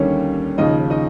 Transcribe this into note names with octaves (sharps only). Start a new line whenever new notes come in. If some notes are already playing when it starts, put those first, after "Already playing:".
Already playing: D#2 D3 G3 A#3 C#4 D#4 C#5
D#2 C#3 F3 D#4 D#5
D#4 D#5